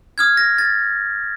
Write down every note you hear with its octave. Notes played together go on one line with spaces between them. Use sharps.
D#6 F6 G#6
A#6
A6